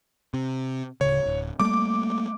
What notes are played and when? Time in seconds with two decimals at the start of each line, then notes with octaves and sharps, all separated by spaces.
0.34 C3
1.01 D1 C#3 C#5
1.26 D1
1.60 G3 A3 A#3 D6